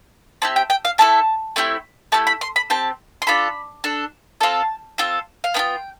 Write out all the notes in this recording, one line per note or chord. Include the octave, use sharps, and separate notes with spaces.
C4 E4 G4 A5
G5
G5
F5
A3 E4 A4 A5
A3 C4 E4 G4
A3 E4 G4 A5
B5
C6
B5
C4 G4 A5
C6
D4 F4 A4 B5
D4 A4
C4 F4 A4 A5
C4 F4 A4
F5
B3 D4 F4 G5